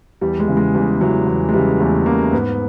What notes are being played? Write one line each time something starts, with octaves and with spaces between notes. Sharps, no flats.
E2 G3
G#3
C#3 E3
G#3
E2 G3
C#3 E3 F#3
E2
G#3
C#3 E3 G3
E2 A3
C#3 E3 A#3
G#2 B3